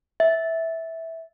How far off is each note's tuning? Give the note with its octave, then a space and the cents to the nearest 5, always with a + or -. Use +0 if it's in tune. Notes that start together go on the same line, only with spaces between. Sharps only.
E5 -10